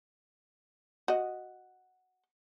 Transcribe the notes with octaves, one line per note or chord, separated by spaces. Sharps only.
F#4 D#5